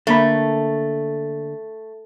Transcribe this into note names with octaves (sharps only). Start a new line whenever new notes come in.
D3 A3 A#3 B5